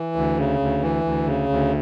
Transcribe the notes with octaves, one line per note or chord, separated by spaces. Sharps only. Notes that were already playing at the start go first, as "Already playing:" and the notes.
Already playing: E3
D2
C#3
D2
E3
D2
C#3
D2